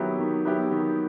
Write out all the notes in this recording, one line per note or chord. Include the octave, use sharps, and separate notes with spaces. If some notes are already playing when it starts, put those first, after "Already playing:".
Already playing: D#3 F#3 B3 E4 G4
D#3
F#3 B3 E4 G4
D#3